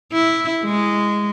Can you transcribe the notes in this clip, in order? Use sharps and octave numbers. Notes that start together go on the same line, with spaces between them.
E4
G#3